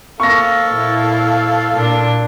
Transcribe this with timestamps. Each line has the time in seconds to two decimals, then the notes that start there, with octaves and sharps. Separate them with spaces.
0.20 A#3 A4 F5 C#6 A#6
0.70 A#2 E4
1.74 A#2 D4